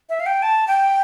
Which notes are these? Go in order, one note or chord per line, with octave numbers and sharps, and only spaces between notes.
E5
F5
G5
A5
G5